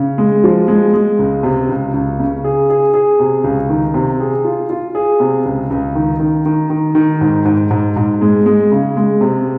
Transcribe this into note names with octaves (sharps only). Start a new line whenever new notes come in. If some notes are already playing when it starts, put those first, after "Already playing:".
Already playing: C#3
G#3
F3
G#3
G#3
C#2
C3
C#2
C#2
C#3
G#4
G#4
G#4
C3
C#2
D#3
C3
G#4
F4
F4
G#4
C3
C#2
C#2
D#3
D#3
D#3
D#3
D#3
G#2
G#2
G#2
G#2
G#3
G#3
C#3
G#3
C3